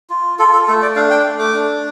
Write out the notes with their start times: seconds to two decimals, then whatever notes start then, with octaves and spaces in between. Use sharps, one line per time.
0.10 F4
0.39 F4 A4
0.53 A4
0.68 A3 A4
0.82 D5
0.96 D4 F5
1.10 G5
1.25 A3
1.39 D6
1.54 D4